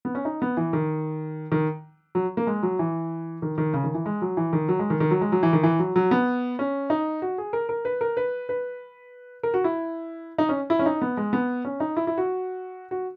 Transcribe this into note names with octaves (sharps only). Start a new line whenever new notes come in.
B3
C#4
D#4
B3
E3
D#3
D#3
F#3
A#3
G#3
F#3
E3
D#3
D#3
C#3
D#3
E3
G#3
F#3
E3
D#3
F#3
G#3
D#3
D#3
F#3
G#3
F#3
E3
D#3
E3
F#3
F#3
B3
C#4
D#4
F#4
G#4
A#4
A#4
B4
A#4
B4
B4
A#4
F#4
E4
D#4
C#4
E4
C#4
D#4
B3
G#3
B3
C#4
D#4
E4
E4
F#4
F#4